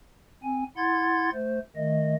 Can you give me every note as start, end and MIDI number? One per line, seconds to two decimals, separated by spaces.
0.43 0.64 60
0.43 0.64 80
0.77 1.30 64
0.77 1.30 78
0.77 1.30 84
0.77 1.30 92
0.77 1.30 93
1.33 1.59 57
1.33 1.59 72
1.76 2.15 51
1.76 2.15 57
1.76 2.15 75